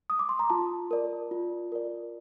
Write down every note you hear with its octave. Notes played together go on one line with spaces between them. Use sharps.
D#6
D6
C6
A#5
F4 A5
A#4 D5
F4
A#4 D5